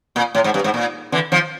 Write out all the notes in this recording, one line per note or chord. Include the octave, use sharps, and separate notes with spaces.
A#2
A2
G#2
G2
G#2
A#2
D3 E3
D#3 F3